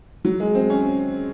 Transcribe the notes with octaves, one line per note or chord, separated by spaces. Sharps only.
F#3
G#3
C4
C#4